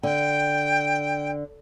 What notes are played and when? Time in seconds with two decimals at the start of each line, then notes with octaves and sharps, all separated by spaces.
0.03 D3 G5